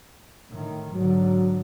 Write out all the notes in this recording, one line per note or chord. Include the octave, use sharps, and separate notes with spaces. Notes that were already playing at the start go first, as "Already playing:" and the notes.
A2 D#3
G#2 D3 F#3